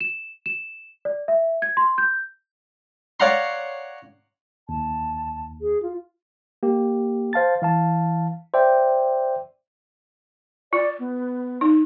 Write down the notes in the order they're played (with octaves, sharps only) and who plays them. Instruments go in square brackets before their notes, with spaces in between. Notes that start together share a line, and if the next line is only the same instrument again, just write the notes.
[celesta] E7
E7
D5
E5
G#6
C6
G6
[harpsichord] C#5 D5 F5 F#5 A#5 C6
[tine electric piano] D#2 [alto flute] A5
[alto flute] G#4
F4
[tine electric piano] A#3 G4
C5 F5 A5 A6
E3 F5 A5
C5 D5 E5 G5
[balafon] F4 [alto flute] D5
[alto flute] B3
[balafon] D#4